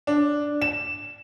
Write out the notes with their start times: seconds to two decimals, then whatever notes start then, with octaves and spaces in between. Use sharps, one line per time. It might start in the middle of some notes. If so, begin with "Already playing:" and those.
0.07 D4
0.62 E7